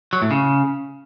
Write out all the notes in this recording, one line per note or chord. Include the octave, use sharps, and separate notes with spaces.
F#3
A2
C#3